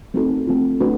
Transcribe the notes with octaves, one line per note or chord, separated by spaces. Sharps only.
A3 C4 D#4 F#4 A4
A3 C4 F4
A3 D4 F#4 B4